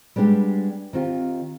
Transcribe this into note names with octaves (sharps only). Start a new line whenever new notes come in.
G3 G#3 B3 D4 G4
D#3 C4 F4 G4